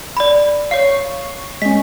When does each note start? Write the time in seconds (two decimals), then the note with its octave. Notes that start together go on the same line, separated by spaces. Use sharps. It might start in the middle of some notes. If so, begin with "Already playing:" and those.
0.17 D5 B5
0.71 C#5 F5 C#6 C7
1.62 G#3 C#4 B6